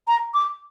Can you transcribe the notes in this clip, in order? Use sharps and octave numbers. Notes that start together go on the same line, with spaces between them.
A#5
D6